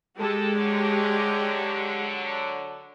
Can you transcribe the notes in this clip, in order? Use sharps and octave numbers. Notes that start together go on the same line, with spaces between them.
G#3 G4 A4
D3 F#3